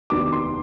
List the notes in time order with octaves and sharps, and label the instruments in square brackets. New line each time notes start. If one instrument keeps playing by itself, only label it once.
[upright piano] F1 D#2 D#3 B3 D4 D6
C6